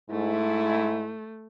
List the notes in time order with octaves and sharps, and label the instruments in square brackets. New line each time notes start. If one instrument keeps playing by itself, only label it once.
[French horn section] G#2 E4 [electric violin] A3